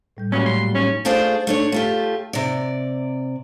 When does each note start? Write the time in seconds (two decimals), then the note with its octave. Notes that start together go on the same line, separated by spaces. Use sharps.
0.17 A2 G3 G6
0.32 A#2 F#3 G3 A3 C#4
0.46 C6
0.75 C#4 D#4
1.05 A3 D4 F4 G#4 C5 D5
1.47 A3 D4 C#5
1.72 A3 F4 G4
2.33 C3 D5